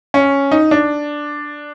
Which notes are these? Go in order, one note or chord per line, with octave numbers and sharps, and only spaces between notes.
C#4
D#4
D4